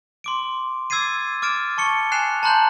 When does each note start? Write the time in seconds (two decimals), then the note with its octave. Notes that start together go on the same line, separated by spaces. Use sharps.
0.24 C6 D6 D7
0.90 D6 E6 G#6 A6 C7 D#7
1.42 D6 F6 A6 D7 E7
1.78 A5 C#6 C#7 G7
2.12 G#5 F#6 C7 E7 F7
2.43 A5 A#5 C6 F#6 G6 F#7